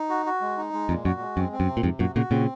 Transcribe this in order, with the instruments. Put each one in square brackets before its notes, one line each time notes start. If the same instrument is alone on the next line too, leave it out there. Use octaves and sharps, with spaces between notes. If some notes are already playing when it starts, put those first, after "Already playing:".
Already playing: [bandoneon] D#4
F#4
F#4
G#3
D#4
G#3
[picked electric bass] F2 [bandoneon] A#2
[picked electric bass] F#2 [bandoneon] F#4
[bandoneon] G#3
[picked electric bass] F#2 [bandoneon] C4
[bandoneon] C4
[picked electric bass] F#2
[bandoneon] C3
[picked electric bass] A#2
[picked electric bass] F2 G#2 [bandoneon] C3
[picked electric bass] F#2 A#2 [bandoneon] F#4
[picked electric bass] A#2 C#3 [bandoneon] F#4
[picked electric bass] A#2 C#3 [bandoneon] C4